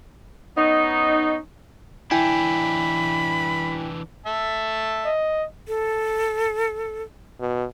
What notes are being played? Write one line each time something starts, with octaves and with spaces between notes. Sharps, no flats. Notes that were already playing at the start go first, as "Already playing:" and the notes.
B3 C#4 D#4
E3 D4 E4 G5 G#5 B5
E5 A5
D#5
A4
B2